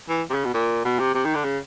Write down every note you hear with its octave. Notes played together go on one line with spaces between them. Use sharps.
E3
C3
C#3
B2
A#2
B2
C3
C3
D#3
D3
C#3